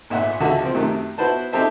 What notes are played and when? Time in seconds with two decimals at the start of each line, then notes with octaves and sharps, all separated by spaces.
0.10 G#1 A#2 E5 F#5
0.40 C#2 D3 E3 F#4 A4 E5
0.62 F3 C4
0.74 F#2 C3 D#3 A3
1.18 B3 E4 F#4 B4 C5 A5
1.53 C4 D#4 G4 A4 C5 E5